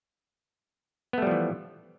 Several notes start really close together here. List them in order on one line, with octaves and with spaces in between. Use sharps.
B3 A3 G3 F3 E3